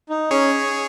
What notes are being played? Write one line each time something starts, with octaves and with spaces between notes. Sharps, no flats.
D#4
C#4 G#4 C#5